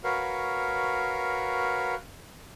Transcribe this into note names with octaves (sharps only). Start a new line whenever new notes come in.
F#4 A#4 B4 C#5 F5